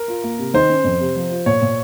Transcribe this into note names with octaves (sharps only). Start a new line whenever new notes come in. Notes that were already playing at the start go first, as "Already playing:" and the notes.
Already playing: A#4
F4
A#3
C3
D#3 C5
C#4
F2
C3
F3
F4
A#2 C#5
A#2